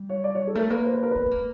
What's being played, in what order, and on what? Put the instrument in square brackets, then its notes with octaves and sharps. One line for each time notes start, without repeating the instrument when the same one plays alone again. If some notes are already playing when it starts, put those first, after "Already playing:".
Already playing: [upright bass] G3
[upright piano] C#5
D5
C#5
A4
[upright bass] A3 [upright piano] A#4
[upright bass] A#3 [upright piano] B4
[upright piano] C5
B4
A#4
[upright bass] B3 [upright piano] B4
[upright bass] B3
A#3